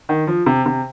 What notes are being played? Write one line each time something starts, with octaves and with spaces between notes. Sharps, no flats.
D#3
F3
C3
C3